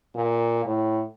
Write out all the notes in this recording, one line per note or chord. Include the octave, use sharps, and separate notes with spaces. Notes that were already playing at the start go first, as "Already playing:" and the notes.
A#2
A2